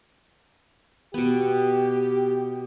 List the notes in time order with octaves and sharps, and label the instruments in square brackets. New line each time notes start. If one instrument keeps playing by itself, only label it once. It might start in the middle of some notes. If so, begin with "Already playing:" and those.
[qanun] B2 B3 [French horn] G4